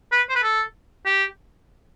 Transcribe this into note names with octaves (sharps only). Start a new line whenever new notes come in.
B4
C5
B4
A4
G4